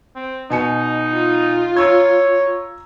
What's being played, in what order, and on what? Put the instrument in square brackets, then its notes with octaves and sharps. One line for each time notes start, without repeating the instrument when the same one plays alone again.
[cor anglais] C4
[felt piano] B2 G#5 C#7 [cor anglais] D#4
[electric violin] F4
[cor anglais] C#5 [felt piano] A#5 E6 G#6